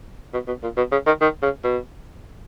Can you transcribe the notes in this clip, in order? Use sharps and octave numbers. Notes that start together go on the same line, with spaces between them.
B2
B2
A#2
B2
C#3
D#3
D#3
C#3
B2